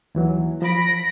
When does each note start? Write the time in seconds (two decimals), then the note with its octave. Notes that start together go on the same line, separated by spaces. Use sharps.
0.15 D#2 E3 F#3
0.62 F3 B5 A#6 D7